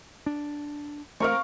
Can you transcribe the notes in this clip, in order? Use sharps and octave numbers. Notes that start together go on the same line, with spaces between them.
D4
A3 C4 A#4 F5 C#6